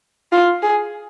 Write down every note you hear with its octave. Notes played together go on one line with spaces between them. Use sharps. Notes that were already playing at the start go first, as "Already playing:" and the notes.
F4
G#4